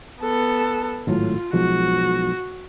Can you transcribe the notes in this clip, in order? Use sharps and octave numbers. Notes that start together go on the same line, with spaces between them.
B3 A4
G#1 A2 F#3 F4
B1 F3 G#3 F#4